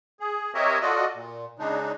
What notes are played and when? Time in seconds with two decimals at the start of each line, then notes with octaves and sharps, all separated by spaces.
0.20 G#4
0.55 C4 G4 A#4 C#5 D#5 E5
0.82 F4 F#4 A4 D5 D#5
1.15 A#2
1.59 C#3 G#3 D4 D#4